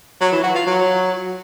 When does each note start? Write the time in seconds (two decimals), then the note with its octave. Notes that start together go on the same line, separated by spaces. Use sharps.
0.21 F#3
0.32 E3
0.43 F#4
0.55 F4
0.66 F#3